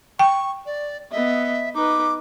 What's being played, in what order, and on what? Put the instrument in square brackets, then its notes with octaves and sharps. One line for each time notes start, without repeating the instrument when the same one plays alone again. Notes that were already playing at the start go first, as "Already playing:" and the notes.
[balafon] G5 [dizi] C#6
[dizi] D5
[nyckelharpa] B3 D#5 [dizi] E5
[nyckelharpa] D#4 B4 [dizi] D6